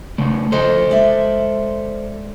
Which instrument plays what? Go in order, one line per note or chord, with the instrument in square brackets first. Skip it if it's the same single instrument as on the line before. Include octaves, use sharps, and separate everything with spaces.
[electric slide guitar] C#3 A3
[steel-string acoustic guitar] D2 F3 D#5 [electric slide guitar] A4 C5
[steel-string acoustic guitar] G#3 D5 E5